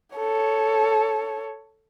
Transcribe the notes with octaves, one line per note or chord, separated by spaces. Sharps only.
A4 C#5